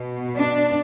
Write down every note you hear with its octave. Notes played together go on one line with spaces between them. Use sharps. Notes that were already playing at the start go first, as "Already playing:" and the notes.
Already playing: B2
D4